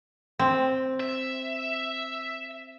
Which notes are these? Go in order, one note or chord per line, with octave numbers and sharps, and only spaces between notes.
C4
E5